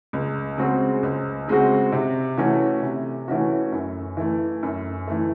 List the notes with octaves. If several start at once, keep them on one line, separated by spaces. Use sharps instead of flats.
C#2
C#3 G#3 C4 F#4
C#2
C#3 G#3 C4 F#4
C3
E3 A3 C#4 F#4
C3
E3 A3 C#4 F#4
F#2
E3 A3
F#2
E3 A3